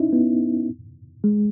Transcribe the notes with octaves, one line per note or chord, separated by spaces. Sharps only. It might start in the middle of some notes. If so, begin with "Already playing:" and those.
Already playing: C#4 D#4 E4
B3
G#3